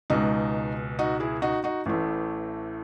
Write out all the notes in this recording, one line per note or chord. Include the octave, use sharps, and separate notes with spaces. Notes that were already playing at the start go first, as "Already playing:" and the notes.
C#2 B2 G#3 D#4
D#4 F#4
E4 G#4
D#4 F#4
D#4 F#4
A1 A2 E3 A3